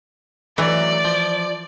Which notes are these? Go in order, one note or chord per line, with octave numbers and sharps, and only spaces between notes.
E3 F#3 A3 D#4 D5
F3